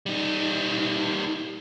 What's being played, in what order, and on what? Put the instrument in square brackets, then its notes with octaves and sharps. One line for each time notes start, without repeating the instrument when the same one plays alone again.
[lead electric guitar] G3 D#4